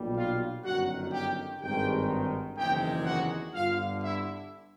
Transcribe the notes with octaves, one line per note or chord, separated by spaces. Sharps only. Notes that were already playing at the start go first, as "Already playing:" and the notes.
Already playing: B1 A#2 G3
F4 F5
G1 F#2 D#3 F#4 F#5
G4 G5
G#1 G2 D#3 G#3 G4 G5
F#1 E2 C3 D#3 G#3 G4 G5
F#4 F#5
G1 G2 D3 F4 F5
E4 E5